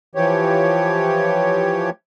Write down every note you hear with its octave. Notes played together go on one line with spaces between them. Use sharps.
E3 F3 G4 C#5